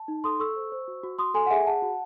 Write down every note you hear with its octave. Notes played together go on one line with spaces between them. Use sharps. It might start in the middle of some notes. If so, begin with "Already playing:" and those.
Already playing: A5
D#4
A4 C6 D#6
A4 C#6 E6
C5
C5
F#4
F#4
F#4 C6 D#6
A4 G#5 C6
F#5
G#4 E5 G#5
G#4 F#5 A5
F#4